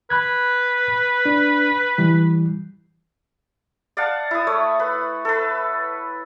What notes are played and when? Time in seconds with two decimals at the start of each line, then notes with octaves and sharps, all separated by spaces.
0.10 B4 B5 F#6 G#6
1.26 D4
1.98 E3 G3
3.97 D5 F5 F#5 A5
4.31 E4 D#6
4.47 A3 C#5
4.80 B4
5.25 A4 B4